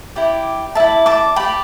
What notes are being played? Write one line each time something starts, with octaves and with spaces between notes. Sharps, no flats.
E4 G4 D5
E4 A4 D5 E5 A5
A5 D6
G4 D5 G5 B5